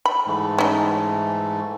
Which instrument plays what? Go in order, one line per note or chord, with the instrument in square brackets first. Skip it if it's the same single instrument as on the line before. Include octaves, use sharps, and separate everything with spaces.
[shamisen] B5
[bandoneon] G#2 E3 A3
[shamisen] C#4 D#4